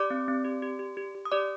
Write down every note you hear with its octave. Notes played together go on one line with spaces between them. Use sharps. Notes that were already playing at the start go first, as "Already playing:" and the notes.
Already playing: G4 D5 D6
C4
C4
G4
G4
G4
G4
G4
D#6
G4 D5 D6